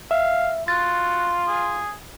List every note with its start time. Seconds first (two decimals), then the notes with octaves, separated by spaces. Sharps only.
0.11 E5 F5
0.68 F4 F#4 A6
1.47 G#4